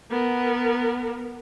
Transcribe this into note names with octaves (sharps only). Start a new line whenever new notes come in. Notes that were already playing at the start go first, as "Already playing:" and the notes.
B3 A#4